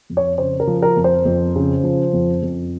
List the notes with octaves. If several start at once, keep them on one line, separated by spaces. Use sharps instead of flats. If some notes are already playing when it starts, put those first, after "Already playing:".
F2
C#5
C#3 C5
A#4
F3
A#4
F2
C5
F2
C#3
F3
F2
F2